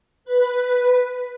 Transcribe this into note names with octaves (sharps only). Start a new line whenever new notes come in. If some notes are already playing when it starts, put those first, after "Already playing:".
B4